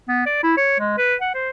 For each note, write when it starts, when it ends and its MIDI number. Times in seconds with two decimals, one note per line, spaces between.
0.08 0.24 59
0.26 0.40 74
0.43 0.55 64
0.57 0.77 73
0.79 0.94 56
0.98 1.15 71
1.21 1.34 78
1.34 1.50 72